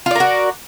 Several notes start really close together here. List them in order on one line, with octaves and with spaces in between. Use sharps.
F4 D5 A#4 F#4